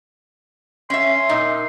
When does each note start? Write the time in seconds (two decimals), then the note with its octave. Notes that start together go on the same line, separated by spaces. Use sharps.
0.90 C#4 E5 C6
1.29 A#2 D#4